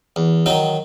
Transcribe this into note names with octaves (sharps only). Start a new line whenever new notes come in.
E2
D#3 F#3 D#4